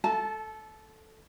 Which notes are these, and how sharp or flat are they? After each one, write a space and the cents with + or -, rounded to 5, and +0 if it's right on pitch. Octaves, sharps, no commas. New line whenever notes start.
A4 +0 A5 -25